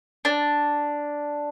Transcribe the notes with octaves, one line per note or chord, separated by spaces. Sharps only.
D4